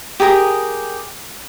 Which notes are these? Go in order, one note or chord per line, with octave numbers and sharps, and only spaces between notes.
G4 G#4 A#4 D#6